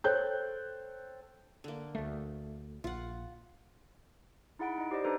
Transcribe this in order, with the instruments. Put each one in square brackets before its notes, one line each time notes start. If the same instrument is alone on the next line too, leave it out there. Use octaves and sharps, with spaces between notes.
[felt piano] A4 C5 C#5 G5 F#6 G6
[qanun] D3 A#3
[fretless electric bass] D2 A3
[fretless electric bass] A#1 [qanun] F4 F#5
[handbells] D#4 E4 G#4 F#5 B5 D7
D#4 D#5
G4 C5 D5 D#5
D4 D#4 G4 A4 B4 C5